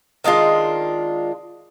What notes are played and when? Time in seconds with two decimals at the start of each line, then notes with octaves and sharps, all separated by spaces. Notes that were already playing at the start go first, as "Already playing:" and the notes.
0.24 D#3 G#3 D4 F4